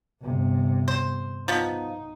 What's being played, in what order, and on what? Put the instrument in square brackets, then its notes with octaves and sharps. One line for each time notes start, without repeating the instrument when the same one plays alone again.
[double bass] G1 C3
[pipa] C5
[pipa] F3 B3 [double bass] D#4